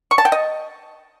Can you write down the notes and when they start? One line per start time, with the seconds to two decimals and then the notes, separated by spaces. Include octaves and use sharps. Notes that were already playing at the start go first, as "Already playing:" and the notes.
0.11 C#6
0.18 A5
0.25 G5
0.32 D#5